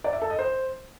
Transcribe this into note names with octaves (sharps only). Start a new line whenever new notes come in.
D5
E5
A4
D#5
C5